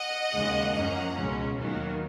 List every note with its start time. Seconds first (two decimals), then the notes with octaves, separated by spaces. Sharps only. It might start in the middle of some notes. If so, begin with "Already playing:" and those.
Already playing: D#5 F#5
0.32 D#2 C#3 G#3
0.74 F#2 F3 A#3 C#4 F#5 A#5
1.16 C#2 B2 G#3 C#4
1.57 D#2 D#3 F#3 B3